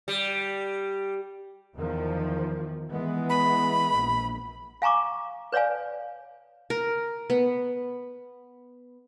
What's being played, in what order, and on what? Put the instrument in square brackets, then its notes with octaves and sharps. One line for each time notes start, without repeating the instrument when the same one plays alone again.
[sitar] G3
[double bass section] E2 D#3 F3
E3 G#3 B3
[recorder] B5
[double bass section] A#1
[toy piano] F5 G#5 A#5 C#6 D6
B4 C#5 D5 F5 G#5
[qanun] A#4
B3